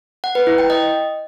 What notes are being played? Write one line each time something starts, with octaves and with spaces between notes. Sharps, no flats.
F#5
B4
E4
G5
D#5